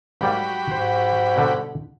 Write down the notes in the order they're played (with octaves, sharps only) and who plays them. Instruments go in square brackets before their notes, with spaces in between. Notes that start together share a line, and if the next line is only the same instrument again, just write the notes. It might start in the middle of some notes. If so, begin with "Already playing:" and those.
[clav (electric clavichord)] G#2 G3 A#3 [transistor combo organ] F#3 G4 B5
[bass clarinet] G#2 [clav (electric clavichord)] C5
[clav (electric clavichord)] B2 D3 G3